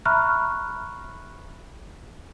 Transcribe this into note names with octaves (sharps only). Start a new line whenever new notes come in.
E5 A#5 B5 C#6 F6 F#6